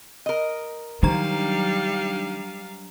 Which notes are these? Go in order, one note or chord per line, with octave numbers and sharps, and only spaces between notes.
A#4 D#5
D#3 F#3 G3 D4 F5 A#5